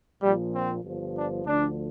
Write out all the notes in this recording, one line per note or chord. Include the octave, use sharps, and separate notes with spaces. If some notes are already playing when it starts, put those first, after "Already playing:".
A#1 A#2 F3 G3
C4
G1 G2 F3
D4
D2 D3 F3 D4